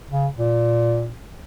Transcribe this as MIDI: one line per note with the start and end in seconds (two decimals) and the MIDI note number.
0.11 0.27 49
0.37 1.13 46